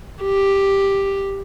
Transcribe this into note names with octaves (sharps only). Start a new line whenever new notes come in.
G4